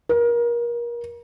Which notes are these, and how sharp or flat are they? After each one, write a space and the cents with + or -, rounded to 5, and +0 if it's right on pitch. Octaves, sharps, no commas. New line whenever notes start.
A#4 +30